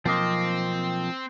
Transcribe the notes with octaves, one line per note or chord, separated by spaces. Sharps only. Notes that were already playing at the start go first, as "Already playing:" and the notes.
B1 F3 A#3 C4 D#5